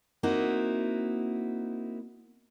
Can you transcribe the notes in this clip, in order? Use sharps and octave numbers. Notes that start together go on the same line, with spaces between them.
A#3 C4 D#4 E4 F#4